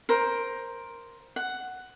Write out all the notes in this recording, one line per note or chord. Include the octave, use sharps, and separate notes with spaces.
A#4 C5
F#5